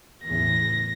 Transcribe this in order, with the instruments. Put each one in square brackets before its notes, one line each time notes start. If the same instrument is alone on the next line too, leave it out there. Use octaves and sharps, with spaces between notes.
[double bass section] E2 A2 C#3 [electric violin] A#6